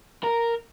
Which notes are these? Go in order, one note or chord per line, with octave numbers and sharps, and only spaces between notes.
A#4